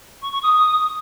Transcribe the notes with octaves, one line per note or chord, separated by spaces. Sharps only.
C#6
C#6
D#6